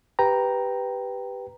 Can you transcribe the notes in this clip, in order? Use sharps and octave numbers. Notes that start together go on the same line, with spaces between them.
G4 B4 G5 A#5